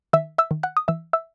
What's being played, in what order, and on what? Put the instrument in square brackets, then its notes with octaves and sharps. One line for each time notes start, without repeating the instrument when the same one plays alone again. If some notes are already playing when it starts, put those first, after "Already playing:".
[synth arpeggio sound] D#3 E5 E6
E5 E6
D#3
F#5 F#6
D#6
E3 E5 E6
E5 E6